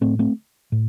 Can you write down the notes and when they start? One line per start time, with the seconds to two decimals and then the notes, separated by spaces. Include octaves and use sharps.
0.01 A2 A3 C4
0.19 A3 C4
0.72 A2